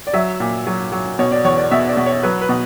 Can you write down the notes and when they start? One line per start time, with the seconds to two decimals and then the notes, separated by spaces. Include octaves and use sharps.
0.07 D5
0.13 F#3 E5
0.40 A#2
0.67 F#3
0.92 F#3
1.19 B2 C#5
1.32 D5
1.44 E2 C#5
1.58 D5
1.71 B2 E5
1.89 D5
1.97 B2
2.06 C#5
2.23 F#3 B4
2.41 B4
2.49 B2